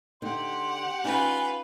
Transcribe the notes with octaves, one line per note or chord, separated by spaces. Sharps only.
D3 C4 D#4 G4 F#5 C6
C#4 D#4 F4 B4 G#5